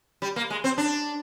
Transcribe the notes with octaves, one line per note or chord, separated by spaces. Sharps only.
G3
A#3
G#3
C4
D4